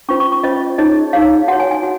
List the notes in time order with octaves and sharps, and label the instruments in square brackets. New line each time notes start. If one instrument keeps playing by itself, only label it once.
[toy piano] C#4 F4 C5 C#6
C#6
C#6
C#4 F4 C5 D#5
D#4 G#4 C#5 D#5
D#4 G#4 C#5 F5
F#4 C#5 F#5
G#5
G#5
F#4